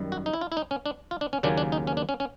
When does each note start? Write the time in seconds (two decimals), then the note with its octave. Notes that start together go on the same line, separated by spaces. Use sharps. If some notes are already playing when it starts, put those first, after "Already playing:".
Already playing: F#2 D#3 G3
0.12 F#4
0.26 D#4
0.33 E4
0.41 F4
0.52 E4
0.57 D#4
0.71 C#4
0.86 D4
1.11 F4
1.21 D4
1.33 C#4
1.43 D#2 C#3 F#3 A#3 C#4 D4
1.58 D4
1.72 D#4
1.87 C#4
1.97 D4
2.09 C#4
2.20 C#4